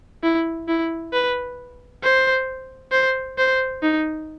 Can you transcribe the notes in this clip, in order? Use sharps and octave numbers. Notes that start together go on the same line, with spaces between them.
E4
E4
B4
C5
C5
C5
D#4